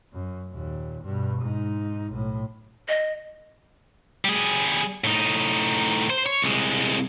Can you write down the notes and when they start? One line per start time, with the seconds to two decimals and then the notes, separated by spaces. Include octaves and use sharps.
0.13 F#2
0.49 D#2 A#2
1.04 G2 B2
1.42 G#2 D#4
2.12 B1 A2
2.88 D#5
4.25 G3 G#4
5.04 A2 D#4
6.10 C5
6.26 C#5
6.42 C2 G#3